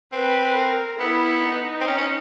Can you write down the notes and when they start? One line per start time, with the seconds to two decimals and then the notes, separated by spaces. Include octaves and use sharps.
0.12 C4 B4
0.56 A#4
1.00 B3 E4
1.43 D#4
1.81 C4
1.87 C#4
1.98 C#4